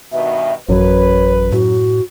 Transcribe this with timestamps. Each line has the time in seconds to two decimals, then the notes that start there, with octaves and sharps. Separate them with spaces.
0.12 G2 B2 D#3 E5
0.69 A1 F#2 B4 C#5
1.52 A2 F#4